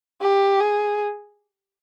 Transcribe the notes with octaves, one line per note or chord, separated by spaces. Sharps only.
G4
G#4